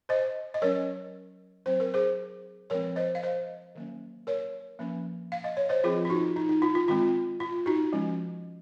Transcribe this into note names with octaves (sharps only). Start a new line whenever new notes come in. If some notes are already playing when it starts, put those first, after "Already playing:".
C5 D#5
D#5
F#3 C#4 A#4 C#5
F#3 C4 C5
A#4
G#4 C5
F3 G#3 C4 A#4 C#5
C5 D#5
F5
C5 D#5
D#3 F#3 A#3 C#4
A#4 C#5
F3 A#3 C#4
F5
D#5
C#5
C5 D#5
F3 C4 F4 G#4
F4
D#4 F#4
D#4
D#4
F4
F4
D#3 G#3 C4 F4
F4
D#4 F#4
F3 G#3 C#4